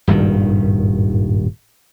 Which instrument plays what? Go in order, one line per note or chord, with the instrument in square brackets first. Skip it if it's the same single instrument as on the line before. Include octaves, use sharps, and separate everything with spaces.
[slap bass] D#1 G#1 G2 D#3